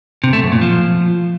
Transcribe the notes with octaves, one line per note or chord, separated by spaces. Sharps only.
C3
A3
F#2
A#2
F3